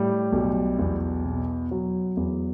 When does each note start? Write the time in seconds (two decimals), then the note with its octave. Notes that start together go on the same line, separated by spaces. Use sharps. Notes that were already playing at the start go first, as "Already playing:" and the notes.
Already playing: A2 G3
0.32 B1
0.79 E2
1.25 B2
1.71 F#3
2.17 E2